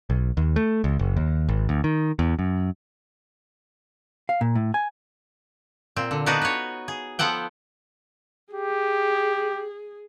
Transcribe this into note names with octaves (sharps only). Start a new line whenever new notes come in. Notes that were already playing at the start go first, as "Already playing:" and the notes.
B1
D#2
A3
C#2
F#1
D#2
G#1
D2
D#3
E2
F#2
F5
A#2
A2
G#5
A#2 C4
D3
B3 D4 D#4 F#4 B4
B4 C#5
G#4
F3 B3 A4 F#5 G5
G4 G#4